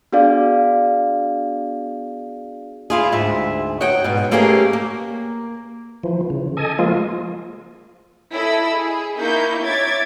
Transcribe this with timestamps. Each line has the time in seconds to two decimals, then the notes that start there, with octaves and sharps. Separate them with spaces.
0.12 B3 D4 F#4 G#4 D5 F5
2.90 E4 F4 G#4
3.12 D2 G#2 E5
3.80 D#4 F#4 C#5 F#5 G5
4.04 G#2 B2
4.31 A3 A#3 C#4 G4 G#4 A#4
4.73 A#3
6.03 E3 F3
6.30 C#3
6.57 A4 D#5 G#5
6.79 F3 G#3 A#3 F4
8.33 E4 A4 D#5 B5 E6
8.73 G#4
9.16 A#3 D#4 E4 C#6 G6
9.62 C#5 E5 D6 G#6 A6